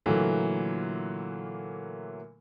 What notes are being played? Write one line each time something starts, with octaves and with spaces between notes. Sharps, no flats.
A#2 D3 E3 F#3 A3 A#3